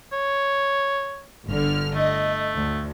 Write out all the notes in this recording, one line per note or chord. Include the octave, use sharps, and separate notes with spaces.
C#5
G1 D3 F6
A3 D#5
D2